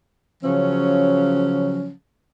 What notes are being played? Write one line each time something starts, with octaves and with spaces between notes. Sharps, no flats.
C#3 F3 F#3 C#4